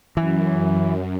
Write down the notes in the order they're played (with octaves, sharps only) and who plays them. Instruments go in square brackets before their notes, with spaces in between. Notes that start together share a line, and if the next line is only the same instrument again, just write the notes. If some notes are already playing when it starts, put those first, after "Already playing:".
[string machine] F#2 [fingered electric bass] E3